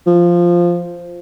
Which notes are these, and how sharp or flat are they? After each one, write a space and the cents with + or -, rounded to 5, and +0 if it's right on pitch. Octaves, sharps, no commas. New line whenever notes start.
F3 -5